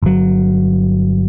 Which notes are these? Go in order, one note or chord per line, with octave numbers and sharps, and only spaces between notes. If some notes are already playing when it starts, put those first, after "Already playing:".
G1 F#3